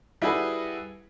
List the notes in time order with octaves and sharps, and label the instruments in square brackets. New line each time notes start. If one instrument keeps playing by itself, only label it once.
[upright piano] G3 E4 F#4 G#4 A4 B4